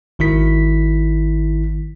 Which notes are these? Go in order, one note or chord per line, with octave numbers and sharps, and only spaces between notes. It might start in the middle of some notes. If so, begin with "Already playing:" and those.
G#1 D#3 E4 B6